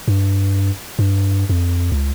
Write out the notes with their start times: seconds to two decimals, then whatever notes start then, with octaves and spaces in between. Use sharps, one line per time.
0.08 G2
0.99 G2
1.49 F2
1.92 C#2